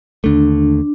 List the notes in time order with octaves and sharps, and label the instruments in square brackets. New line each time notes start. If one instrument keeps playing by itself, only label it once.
[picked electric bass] D#2 D3 A3 [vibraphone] D4